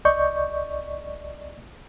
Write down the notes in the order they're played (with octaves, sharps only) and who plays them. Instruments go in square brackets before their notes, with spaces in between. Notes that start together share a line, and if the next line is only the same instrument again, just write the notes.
[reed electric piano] C2 D5 D#5 C#6 G6